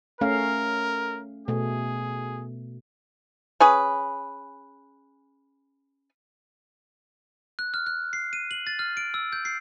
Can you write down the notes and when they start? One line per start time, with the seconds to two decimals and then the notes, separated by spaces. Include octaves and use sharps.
0.21 A3 C#4 A#4 F5
1.48 B2 A3 G#4
3.60 C#4 G#4 B4
7.59 F#6
7.74 F6
7.86 F#6
8.13 C7
8.33 D#7
8.51 F#7
8.67 A6
8.79 F6
8.97 D7
9.14 E6
9.33 G6
9.45 C7